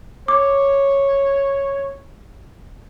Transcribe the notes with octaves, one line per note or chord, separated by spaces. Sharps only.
C#5 D6